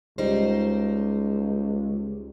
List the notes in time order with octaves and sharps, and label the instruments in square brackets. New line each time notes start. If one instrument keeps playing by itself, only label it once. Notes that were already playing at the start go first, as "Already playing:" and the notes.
[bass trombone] C#2 [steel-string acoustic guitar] G3 D#4 C5